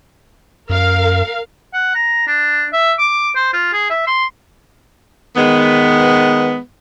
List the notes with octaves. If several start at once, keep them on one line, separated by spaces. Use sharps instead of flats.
F#2 A#4 F5
F#5
A#5
D4
E5
D6
C5
F4
G#4
E5
C6
D#3 G#3 B3